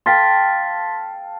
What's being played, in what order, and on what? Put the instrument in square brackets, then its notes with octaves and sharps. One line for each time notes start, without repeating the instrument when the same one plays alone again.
[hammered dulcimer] A4 F5 G5 [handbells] C6 A6 B6